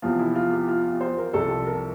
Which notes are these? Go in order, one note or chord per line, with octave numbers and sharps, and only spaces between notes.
E2 C3 F3 F4
E4
F4
G4
F4
F4
C5
A#4
C2 C3 F3 A4
A#4